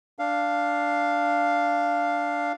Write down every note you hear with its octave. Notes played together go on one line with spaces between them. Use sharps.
D4 F5